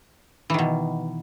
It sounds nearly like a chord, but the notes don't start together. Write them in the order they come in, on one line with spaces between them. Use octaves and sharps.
E3 D#3 B2